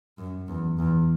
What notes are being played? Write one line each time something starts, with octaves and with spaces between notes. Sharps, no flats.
F#2
E2
E2